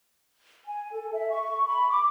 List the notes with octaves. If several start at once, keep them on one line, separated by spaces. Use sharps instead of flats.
G#5
A4
E5
C#6
B5
D6